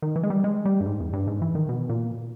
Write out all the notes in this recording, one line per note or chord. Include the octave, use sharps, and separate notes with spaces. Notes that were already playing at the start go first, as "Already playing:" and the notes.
D#3
E3
G#3
G3
G#3
G3
G2
G#2
E2
G2
G#2
E3
D#3
B2
A#2